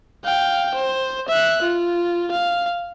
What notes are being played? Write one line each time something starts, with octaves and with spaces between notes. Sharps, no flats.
F5 G5
C5
E5 F#6
F4
F5